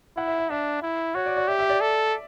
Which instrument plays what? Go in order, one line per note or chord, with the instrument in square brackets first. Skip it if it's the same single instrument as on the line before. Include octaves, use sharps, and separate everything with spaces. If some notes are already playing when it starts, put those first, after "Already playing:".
[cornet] E4 [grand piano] F#5
[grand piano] E5
E5
[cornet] D4 [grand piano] E5
[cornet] E4
[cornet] F#4 [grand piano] C#5
[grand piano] D5
D5
[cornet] G4 [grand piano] E5
[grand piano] E5
D5
[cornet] A4